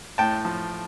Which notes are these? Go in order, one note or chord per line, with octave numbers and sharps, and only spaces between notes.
A2 G5 A5
F3